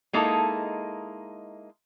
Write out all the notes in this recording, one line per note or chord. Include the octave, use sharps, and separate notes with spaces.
G#3 A#3 D#4 E4 A4